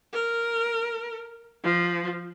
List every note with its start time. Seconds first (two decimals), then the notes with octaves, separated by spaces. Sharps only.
0.13 A#4
1.64 F3